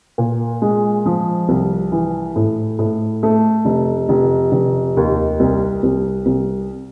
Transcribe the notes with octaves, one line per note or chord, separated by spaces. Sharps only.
A#2
G#3
F3
C2
E3
A2
A2
A3
F1
F1
F1
D#2
C2
C2
C2